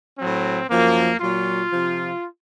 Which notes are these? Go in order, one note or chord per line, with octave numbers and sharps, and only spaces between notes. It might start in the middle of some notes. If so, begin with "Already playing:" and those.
A2 F#3 C4
F#2 F3 A#3
A#2 F#3 F4
C3 F3